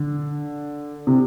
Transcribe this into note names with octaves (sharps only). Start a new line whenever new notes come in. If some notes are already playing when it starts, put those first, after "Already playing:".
Already playing: D3
C3